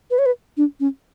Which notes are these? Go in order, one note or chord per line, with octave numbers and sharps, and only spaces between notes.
B4
C#5
B4
D4
C#4